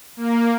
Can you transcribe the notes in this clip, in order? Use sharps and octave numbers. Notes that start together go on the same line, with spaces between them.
A#3